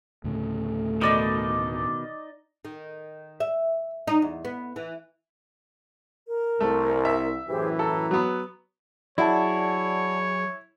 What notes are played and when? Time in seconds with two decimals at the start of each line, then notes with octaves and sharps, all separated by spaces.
0.24 D2 A2 C#3 A3
1.01 B2 D#3 D#4 D5 D#5
2.65 D#3
3.40 E5
4.07 D#4
4.22 E2
4.45 B3
4.76 E3
6.27 A#4
6.60 C2 A3
7.05 E5
7.49 F#2 A2 E3 G4 G#4 C5
7.79 A4 A#5
8.11 F#3 B3
9.18 F#3 E4 G#4 C#5 D5 F#5 A5